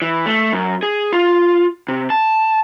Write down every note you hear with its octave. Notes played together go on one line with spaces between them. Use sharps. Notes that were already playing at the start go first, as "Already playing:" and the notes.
E3
A3
F#2
G#4
F4
C3
A5